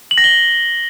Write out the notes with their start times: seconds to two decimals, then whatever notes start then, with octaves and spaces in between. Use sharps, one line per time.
0.11 F#7
0.18 A#6
0.24 G7